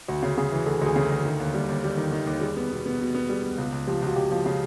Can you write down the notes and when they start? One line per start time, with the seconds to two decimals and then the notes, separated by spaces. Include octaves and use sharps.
0.08 D2 F#4
0.23 C#3
0.38 C#3 G#4
0.52 E3
0.66 D2 A4
0.81 D2 G#4
0.96 C#3
1.06 A4
1.11 D2
1.25 D#3
1.40 D#2
1.54 G3
1.69 D#2
1.84 G3
1.97 D#3
2.12 D#3
2.27 D#2
2.41 G3 G#4
2.56 B3
2.70 B2
2.86 B3
3.00 B2
3.15 B3
3.29 G3 G#4
3.43 B3
3.58 C#2
3.72 C#2
3.87 F3 G4
4.02 C#2 F#4
4.16 C#2 G4
4.31 F3
4.46 C#3